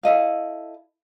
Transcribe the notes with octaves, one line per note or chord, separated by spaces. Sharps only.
E4 A4 D#5 F5